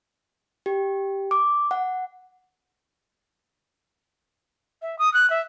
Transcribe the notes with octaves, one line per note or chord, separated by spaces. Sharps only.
G4
D6
F#5
E5
D#6
F#6
E5